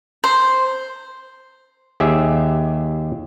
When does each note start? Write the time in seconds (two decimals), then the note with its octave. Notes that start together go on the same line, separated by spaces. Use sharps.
0.24 C5
2.00 D#2 G4 G#4 E5